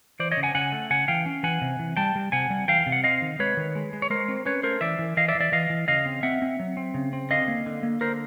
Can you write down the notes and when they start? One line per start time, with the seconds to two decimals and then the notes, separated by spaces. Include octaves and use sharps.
0.19 E3 C5 D5
0.31 C#5 D#5
0.37 C#3
0.43 F#5 G#5
0.55 C#3 F#5 G#5
0.72 A3
0.90 C#3 F#5 G#5
1.08 E3 F5 G5
1.26 C#4
1.43 E3 F#5 G#5
1.61 C3
1.79 E3
1.97 G3 G5 A5
2.16 G3
2.32 C3 F#5 G#5
2.50 G3
2.68 E3 F5 G5
2.86 C3
2.92 F#5
3.04 C4 D#5 F5
3.22 D#3
3.39 G#3 B4 C#5
3.57 D#3
3.75 G#3
3.93 G#3
4.02 C#5
4.10 G#3 A#4 C5
4.28 C4
4.45 C#4 B4 C#5
4.63 A3 A#4 C5
4.81 E3 D5 E5
4.99 E3
5.17 E3 D#5 F5
5.28 D5 E5
5.35 E3
5.41 D5 E5
5.52 E3 D#5 F5
5.70 E3
5.88 C#3 D#5 F5
6.06 C4
6.23 C4 E5 F#5
6.42 C4
6.59 F#3
6.77 C4
6.94 C#3
7.13 C4
7.30 D3 D#5 F5
7.48 A#3
7.66 D3
7.83 A#3
8.01 D3 A#4 C5